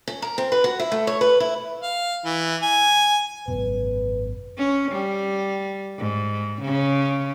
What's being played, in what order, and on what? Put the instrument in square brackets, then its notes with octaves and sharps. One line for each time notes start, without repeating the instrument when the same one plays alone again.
[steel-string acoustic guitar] C#4
A#4
C4
B4
F#4
E4
A3
C#5
B4
E4
[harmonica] F5
E3
G#5
[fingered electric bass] G#1 F#2 B2 [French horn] B4
[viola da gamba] C#4
G3
G#2
C#3